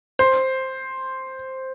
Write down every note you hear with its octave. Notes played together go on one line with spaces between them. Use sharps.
C5